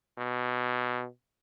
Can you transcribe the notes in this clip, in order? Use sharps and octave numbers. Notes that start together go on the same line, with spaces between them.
B2